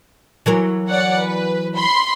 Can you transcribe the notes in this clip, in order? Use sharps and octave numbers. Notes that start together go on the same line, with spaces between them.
E3 F#3 A#4
C#5 D5 F#5
B4
B5 C6